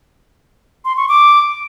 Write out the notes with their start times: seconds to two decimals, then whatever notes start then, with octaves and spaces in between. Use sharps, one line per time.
0.85 C6
0.97 C#6
1.09 D6